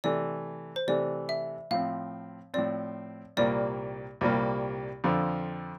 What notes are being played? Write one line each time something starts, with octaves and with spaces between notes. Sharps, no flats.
C3 E3 A3 D5
C5
C3 E3 A3 D5
E5
A2 F3 C4 F5
A2 F3 C4 D5
C2 A#2 G3 A#3 D5
C2 A#2 G3 A#3
F2 D3 F3